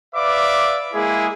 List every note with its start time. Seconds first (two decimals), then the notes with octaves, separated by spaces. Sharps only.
0.15 B4 D5 E5 F5 D6
0.94 G#3 A#3 E4 G#4